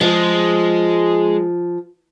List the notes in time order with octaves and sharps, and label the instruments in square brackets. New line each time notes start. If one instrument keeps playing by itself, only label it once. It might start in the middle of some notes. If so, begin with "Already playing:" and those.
[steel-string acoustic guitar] F3 [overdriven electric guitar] G#3